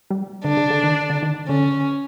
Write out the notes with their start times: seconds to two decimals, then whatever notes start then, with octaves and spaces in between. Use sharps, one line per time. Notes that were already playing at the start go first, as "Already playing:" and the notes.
0.10 G3
0.44 D3 D4
0.57 C#3
0.70 D3
0.83 D#3
1.10 D3
1.22 D#3
1.48 D3 C#4